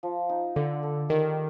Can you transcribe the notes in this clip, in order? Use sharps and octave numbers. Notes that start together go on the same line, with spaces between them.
F3
D#4
D3 D5
A4
D#3 G4